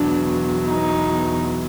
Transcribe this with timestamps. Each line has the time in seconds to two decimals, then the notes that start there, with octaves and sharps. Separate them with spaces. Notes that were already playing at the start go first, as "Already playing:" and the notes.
Already playing: E2 B2 F#3 D4
0.66 D#4